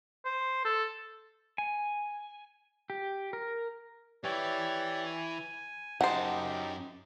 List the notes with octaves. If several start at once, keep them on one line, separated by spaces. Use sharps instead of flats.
C5
A4
G#5
G4
A#4
E3 G4 C#5 D5
G#5
F#2 D#4 G4 C5 F#5 A5 D6